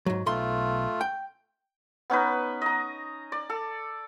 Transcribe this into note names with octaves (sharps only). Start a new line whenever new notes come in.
G#2 F#3
B1 A3 F4 C6
G5
B3 C#4 D#4 B4
D#5 A#5
D5
A4